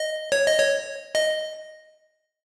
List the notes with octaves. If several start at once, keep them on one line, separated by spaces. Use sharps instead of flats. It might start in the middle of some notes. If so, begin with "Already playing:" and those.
Already playing: D#5
C#5
D#5
C#5
D#5